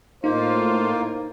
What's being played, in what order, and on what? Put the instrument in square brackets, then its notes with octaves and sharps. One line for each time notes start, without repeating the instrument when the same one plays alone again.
[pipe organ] A2 F4 [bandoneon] A#3 [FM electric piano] D#4 [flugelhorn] C5